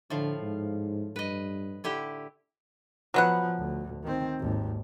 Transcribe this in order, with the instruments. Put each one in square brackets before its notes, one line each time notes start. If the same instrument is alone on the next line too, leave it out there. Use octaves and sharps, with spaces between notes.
[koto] A2 F3 F5 [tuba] D3
[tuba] G#2
[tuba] G2 [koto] B4 D#5
[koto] D3 E4 G4
[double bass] F3 [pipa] F#3 B3 F#5
[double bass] D2
D#3 C4
G#1 D#2